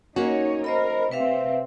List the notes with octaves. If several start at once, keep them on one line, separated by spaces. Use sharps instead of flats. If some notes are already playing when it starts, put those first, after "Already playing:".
A#3 C#4 D#4 F#4 C#5
A#4 C5 D#5 B5
C3 C4 B4 E5 F5